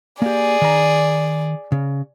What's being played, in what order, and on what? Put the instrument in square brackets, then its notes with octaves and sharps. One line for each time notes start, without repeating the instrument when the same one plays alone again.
[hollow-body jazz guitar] A#3 G4 [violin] G#4 D5
[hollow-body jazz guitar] D#3 A#5
C#3